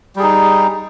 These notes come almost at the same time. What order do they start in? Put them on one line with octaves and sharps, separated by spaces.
G3 G#4 D#4